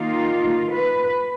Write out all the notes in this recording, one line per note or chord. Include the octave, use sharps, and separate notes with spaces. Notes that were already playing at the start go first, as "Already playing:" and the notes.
Already playing: D#3 A#3 D#4 F4
B4